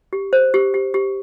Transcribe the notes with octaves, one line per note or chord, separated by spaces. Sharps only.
G4
C5
G4
G4
G4